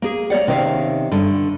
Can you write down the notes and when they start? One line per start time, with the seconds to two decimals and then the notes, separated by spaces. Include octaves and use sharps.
0.02 A#3 G#4
0.30 A#3 C#5 D5 F#5
0.47 C3 D#3 C#4 D5 E5 F5
1.11 G2 D3